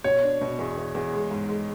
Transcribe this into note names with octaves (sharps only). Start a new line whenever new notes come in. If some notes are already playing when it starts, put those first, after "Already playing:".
B2 C#5
D4
B2
E2
E2
E2
G#3
G#2
G#3